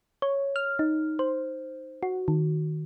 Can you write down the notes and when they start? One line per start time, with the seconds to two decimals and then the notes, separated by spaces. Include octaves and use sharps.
0.22 C#5
0.56 F6
0.79 D#4
1.19 C5
2.03 F#4
2.28 D#3